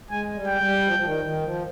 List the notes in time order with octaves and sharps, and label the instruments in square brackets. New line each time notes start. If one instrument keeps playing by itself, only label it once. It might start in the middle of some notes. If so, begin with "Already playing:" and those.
[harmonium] G#3 [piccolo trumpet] G#5
[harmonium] G3
[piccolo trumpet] G5
[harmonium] G3
F3
F3
D#3
D#3
F3